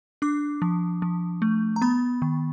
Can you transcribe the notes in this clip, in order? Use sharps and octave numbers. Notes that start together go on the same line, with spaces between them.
D4 D6
F3
F3
A3
A#5
B3 B5
D#3